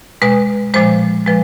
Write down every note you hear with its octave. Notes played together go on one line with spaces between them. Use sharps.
B2 G#3 B4
A#2 F3 G#3 C5
F3 G#3 B4